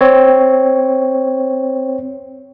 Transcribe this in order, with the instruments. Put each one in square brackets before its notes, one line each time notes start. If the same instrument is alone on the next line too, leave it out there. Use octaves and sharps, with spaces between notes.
[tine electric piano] C4 C#5